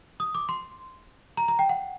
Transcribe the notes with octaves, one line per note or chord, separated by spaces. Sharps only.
D#6
D6
C6
A#5
A#5
G5
F#5